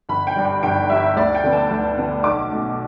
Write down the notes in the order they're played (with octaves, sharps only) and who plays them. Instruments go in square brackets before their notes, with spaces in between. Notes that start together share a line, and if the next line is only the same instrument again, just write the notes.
[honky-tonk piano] G1 B5
G5
G2 G3
G5
G1 G5
G2 G3 E5
D2 D5
G5
D3 B3
A5
D2
D3 B3
B1 D6
B2 A3